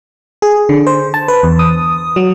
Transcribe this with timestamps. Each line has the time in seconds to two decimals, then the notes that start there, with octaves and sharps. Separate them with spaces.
0.42 G#4
0.69 D3
0.87 C5
1.14 A5
1.28 B4
1.43 E2
1.59 D#6
2.16 F#3